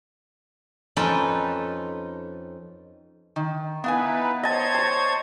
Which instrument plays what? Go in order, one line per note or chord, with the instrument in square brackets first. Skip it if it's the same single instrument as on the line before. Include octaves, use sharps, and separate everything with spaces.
[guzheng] F2 C#4 D#4 A4 B4 G5
[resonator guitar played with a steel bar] D#3
[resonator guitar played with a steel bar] B3 F5 G#5 [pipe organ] D#4 E4 B4
[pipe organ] C5 C#5 G#6 [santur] D#5 A5
[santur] A5 C#6